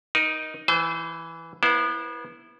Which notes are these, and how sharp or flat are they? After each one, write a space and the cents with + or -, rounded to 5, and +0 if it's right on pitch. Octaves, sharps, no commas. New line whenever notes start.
D#4 +0 A#4 +30
E3 +0 C5 -30 G#5 +45
B3 -30 E4 +0 C5 +0